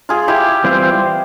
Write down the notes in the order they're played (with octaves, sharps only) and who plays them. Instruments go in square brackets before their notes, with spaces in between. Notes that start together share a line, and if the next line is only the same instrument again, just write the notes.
[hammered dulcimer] F4 G#4
E4 G4
[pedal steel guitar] E3 G3 C4 F4 C5